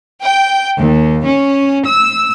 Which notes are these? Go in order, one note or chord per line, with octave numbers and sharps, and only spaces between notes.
G5
D#2
C#4
E6